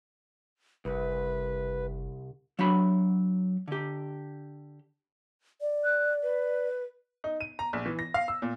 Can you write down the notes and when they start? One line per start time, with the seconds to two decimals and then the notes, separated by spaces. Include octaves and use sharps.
0.85 F#1 C2 B4
2.59 F#3 D4 F#4 B5
3.68 D3 G4
5.61 D5
5.84 F#6
6.22 B4
7.24 D#4
7.41 D#7
7.59 A#5
7.73 A#1
7.86 E3
7.99 A#6
8.14 F5
8.28 E6
8.42 A#2